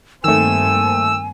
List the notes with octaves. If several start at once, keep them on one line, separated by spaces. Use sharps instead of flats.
G2 D#3 A3 A#3 C4 G#5 E6